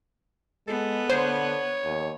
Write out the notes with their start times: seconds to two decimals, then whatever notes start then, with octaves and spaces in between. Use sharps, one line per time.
0.68 G#3 B3 A4
1.09 D3 C5 C#5
1.85 D#2